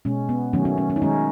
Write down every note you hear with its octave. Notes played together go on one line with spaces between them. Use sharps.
B2 G#3 C#4
B3
D#3 F#3 A3 C#4
C#4
C#4
C#4
D#4
D#3 G#3 C#4